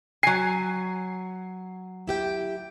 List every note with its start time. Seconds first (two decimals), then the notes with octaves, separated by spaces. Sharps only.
0.23 F#3 G#5 C7
2.08 E4 G4 G5